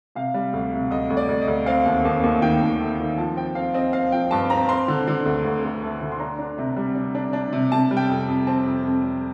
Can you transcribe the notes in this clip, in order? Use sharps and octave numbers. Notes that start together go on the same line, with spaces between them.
C3 F5
G3
D2
C3
D2 D#5
D2
D5
D2
D#5
D2
C4 F5
D#2
D#2
D#2
D#3 G5
D#2
A3
D#3
F3 A5
C4 G5
C4 F5
C4 D#5
C4 F5
F3 G5
G2 A5
C4 A#5
C4 C6
D3
D3
D2
D2
D2
A3
D3
C6
D4 A#5
D4
C3
G3
D4
D4
D4
C3
C3 A5
G3
G5
F2
G5
F2
C4 A5
F2
F2
G3